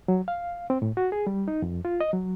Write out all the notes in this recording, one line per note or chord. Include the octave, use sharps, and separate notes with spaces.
F#3
F5
C4
A2
F#4
G#4
G3
D#4
F2
F4
D#5
F#3